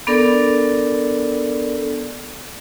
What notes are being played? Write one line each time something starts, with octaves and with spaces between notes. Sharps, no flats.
B3 D4 A4 A#4 D5